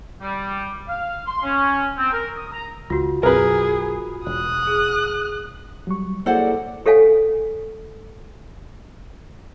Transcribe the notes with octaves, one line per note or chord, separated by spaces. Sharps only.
G3
F5
C6
C#4
C4
A#4
D#6
A#5
C#2 F4 F#4
B1 F#2 G#4 A#4 B4
E1 D#6 F#6
G#4
F#3 G3 C#6
F#3 A#3 E4 G#4 A4 C5 D5 F#5
G4 A4 C#5 F5 F#5 G#5